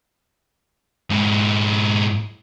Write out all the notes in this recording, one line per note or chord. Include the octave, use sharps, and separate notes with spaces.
G#2 E4